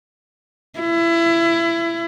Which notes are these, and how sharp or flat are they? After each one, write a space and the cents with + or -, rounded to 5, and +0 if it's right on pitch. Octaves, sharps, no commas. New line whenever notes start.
E4 +25